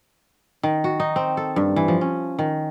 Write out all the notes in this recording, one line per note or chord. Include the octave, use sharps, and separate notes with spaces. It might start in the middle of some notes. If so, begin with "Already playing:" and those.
D#3
F#4
D#4
C4
A4
G2
E3
F3
C#4
D#3